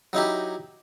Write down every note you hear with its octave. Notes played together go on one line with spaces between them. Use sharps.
F#3 D#4 E4 G4